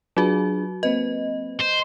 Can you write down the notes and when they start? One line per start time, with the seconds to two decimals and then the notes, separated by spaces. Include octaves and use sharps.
0.17 F#3 D4 F4 F#4 G#4
0.83 A#3 C4 B4 D#5
1.60 C5